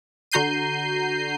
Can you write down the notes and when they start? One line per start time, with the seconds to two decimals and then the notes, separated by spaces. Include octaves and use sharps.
0.32 D3 F#4 A#5 G6 C7 D#7